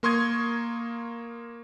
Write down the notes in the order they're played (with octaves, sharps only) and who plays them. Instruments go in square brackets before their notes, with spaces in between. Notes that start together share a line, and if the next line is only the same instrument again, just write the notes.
[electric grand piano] A#3 A#4 C6 C#6 D#6 G#6